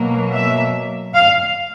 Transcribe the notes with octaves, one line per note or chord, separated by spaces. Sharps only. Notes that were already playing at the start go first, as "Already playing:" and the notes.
Already playing: B2 F#3 A#3
E5
F5